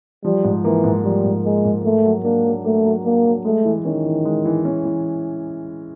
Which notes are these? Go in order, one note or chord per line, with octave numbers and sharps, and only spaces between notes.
F3 G3
G#2
E3 A#3
G#2
F3 G3
G#2
G#3 A#3
G#2
A3 A#3
F#3
A#3 D4
F#3
A3 A#3
F#3
A#3 D4
F#3
G#3 A3
E3
D#3 C#4
E3
G#3
E3
C#4
E3